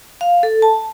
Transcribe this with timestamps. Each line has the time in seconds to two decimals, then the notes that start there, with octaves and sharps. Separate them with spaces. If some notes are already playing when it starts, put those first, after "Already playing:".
0.21 F5
0.43 A4
0.62 A5